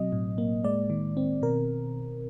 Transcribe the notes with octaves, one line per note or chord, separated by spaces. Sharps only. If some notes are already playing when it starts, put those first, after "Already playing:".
Already playing: B2 F#3 C4 D#5
A2
A#3
G#3 D5
D#3
C4
B2 A#4